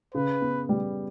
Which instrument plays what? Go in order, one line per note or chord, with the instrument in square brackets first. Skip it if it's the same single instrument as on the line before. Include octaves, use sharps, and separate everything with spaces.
[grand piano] C#3 [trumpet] B4
[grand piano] B3
G3